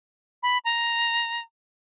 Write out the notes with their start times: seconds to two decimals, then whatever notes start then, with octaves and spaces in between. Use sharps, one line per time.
0.43 B5
0.65 A#5